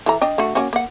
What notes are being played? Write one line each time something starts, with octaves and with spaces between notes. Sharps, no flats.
E3 A4 A#5
D4 D#5 G5
A3 D4 F#4
A#3 C#4 F#4
A#3 F#5